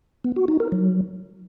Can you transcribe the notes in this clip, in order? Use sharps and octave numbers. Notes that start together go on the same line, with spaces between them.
B3
F#4
D#4
A#4
F#3